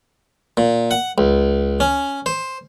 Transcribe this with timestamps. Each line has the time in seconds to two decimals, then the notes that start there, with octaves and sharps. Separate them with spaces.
0.57 A#2
0.91 F#5
1.18 C#2
1.80 C#4
2.26 C5